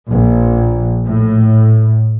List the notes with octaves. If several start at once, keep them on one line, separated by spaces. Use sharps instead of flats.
A#1
A2